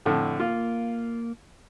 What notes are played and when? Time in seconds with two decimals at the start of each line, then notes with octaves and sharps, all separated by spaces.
0.06 F2 A2 D3
0.40 A#3 F4